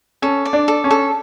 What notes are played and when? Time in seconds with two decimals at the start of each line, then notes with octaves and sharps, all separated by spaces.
0.22 C#4 A4
0.45 D5
0.53 D4
0.68 A4
0.84 C#4
0.91 A4